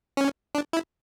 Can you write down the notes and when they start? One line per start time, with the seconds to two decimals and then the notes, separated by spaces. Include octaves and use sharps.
0.17 C#4
0.55 D4
0.73 E4